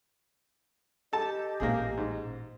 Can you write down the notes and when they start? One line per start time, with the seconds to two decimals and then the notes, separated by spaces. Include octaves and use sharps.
1.13 G4 A4 D#5 A5
1.60 A1 A#2 A#3 C4 G#4
1.97 G#2